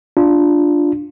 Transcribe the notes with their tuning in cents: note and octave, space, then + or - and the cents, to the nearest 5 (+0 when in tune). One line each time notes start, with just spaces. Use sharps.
D4 +0 F4 +0